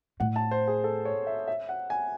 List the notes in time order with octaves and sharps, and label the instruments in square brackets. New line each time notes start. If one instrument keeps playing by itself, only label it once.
[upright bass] A2 [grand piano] F#5
[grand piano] A5
C5
G#4
A4
C#5
E5
E5
F#5
G#5